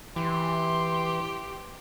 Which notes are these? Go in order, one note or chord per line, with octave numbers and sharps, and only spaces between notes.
E3 G4 C6